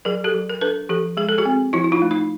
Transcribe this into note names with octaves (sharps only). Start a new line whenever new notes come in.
F#3 G#4 A#4
G4 A4
F#3
A#4
D4 A4 B4
F3 G4 A4
G#3 G#4
A4
F#4 G#4
C4
F3 E4 F#4
E4
D#4 F4
A3
D#4